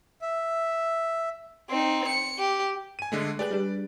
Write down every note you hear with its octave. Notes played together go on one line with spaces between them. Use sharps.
E5
C4 D#4
C#7
G4
G#5 D#7
D3 G#3 A3
G4 G#4 B4 D5 F#6
G3 D4